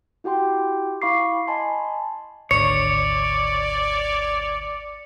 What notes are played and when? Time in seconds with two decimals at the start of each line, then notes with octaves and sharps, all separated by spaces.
0.24 E4 F#4 G4 G5 C6
1.02 E4 F5 B5 C#6 D6 C7
1.47 D#5 G#5 A5 B5 C6
2.51 G#1 D2 D3 C#5 D5 C#7